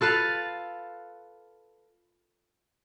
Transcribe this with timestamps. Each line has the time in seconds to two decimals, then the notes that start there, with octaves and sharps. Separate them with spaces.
0.01 F4 A4 B4 F5